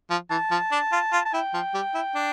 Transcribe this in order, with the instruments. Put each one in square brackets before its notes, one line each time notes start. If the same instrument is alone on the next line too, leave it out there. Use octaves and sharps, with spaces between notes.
[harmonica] F3
[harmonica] E3 [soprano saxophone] A5
[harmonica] F3
D4
F4
F4
[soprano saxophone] A5
[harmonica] E4 [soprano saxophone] G5
[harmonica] F3
G3
E4
D4